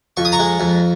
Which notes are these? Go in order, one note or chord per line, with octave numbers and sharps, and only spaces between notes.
F2 C#6
D#6
A#5 C#6
G#3
F2